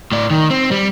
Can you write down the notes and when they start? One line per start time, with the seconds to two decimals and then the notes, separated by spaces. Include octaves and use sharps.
0.12 A2 D5
0.30 D#3
0.50 C4
0.71 G3